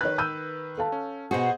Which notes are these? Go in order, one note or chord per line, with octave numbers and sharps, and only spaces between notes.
D#3 B4 C#5 F#6
E6 G6 D#7
A4 F5 A5
C#4
B2 F#4 G#4 C5 D#5